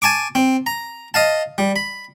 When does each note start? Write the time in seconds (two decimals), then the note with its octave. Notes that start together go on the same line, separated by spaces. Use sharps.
0.02 G#5 A5 C#6 D6
0.35 C4
0.66 A#5
1.14 D#5 F5 A5
1.58 G3
1.76 B5